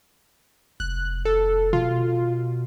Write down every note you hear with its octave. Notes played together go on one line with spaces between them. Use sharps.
F1 F#6
A4
B2 F4